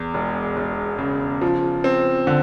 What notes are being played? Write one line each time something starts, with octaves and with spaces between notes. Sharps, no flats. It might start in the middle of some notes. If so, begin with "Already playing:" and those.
Already playing: E2
E1
E1
C#3
F3
C4
D3